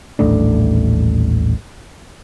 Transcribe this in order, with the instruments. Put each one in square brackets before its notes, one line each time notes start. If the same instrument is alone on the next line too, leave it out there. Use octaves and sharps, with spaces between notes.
[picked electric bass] D#1 A1 A3 D4